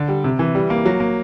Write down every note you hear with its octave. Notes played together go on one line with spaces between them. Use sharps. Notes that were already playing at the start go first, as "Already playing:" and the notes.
Already playing: D3
G3
C3
E3
G3
A#3
F#3
A#3